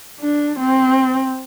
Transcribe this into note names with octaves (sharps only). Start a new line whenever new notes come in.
D4
C4